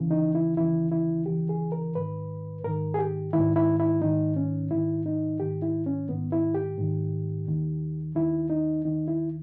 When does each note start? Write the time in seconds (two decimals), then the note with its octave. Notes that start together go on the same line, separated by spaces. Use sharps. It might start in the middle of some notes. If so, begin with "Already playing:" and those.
Already playing: D#2 C#3 E3
0.11 D#4
0.35 E4
0.57 D#2 C#3 E3 E4
0.91 E4
1.26 D#2 C#3 E3 G4
1.49 G#4
1.72 A#4
1.95 G#2 D#3 B4
2.64 G#2 D#3 A#4
2.94 G#4
2.99 G4
3.33 G#2 D#3 E4
3.56 E4
3.80 E4
4.02 G#2 D#3 D#4
4.36 C#4
4.71 G#2 D#3 E4
5.06 D#4
5.40 G#2 D#3 G4
5.62 E4
5.86 C#4
6.09 G#2 D#3 B3
6.32 E4
6.55 G4
6.78 G#2 D#3
7.47 D#2 D#3
8.15 D#2 D#3 E4
8.50 D#4
8.84 D#2 D#3 D#4
9.08 E4